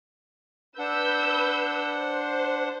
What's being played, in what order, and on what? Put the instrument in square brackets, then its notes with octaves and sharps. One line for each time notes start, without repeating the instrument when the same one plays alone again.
[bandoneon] D4 F#5 [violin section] B4 E6 G6
[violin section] C5